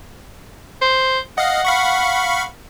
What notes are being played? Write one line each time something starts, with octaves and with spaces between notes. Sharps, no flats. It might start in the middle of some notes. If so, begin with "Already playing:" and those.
C5
D#5 F5 F#5
F5 B5 C#6